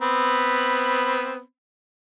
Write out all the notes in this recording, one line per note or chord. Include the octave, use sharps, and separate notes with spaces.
B3 C4 B5